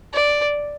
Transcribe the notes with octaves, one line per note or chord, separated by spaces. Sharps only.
D5